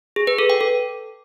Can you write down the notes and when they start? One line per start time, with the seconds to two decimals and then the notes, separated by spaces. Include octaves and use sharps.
0.16 G#4
0.27 B4
0.38 A4
0.50 G5
0.61 A4